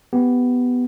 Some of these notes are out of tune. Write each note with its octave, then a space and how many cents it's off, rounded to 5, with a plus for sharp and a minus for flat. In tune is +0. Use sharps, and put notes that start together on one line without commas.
B3 +5 G4 +0